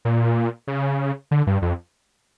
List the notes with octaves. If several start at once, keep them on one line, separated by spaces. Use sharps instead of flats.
A#2
C#3
D3
G2
F2